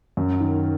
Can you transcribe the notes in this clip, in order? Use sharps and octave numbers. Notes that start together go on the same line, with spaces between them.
F#2
D#3